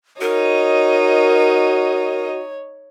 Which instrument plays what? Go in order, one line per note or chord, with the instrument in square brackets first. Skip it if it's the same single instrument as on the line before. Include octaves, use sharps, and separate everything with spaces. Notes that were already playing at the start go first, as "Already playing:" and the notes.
[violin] D#4 D#5 [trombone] F#4 [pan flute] A#4 [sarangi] C#5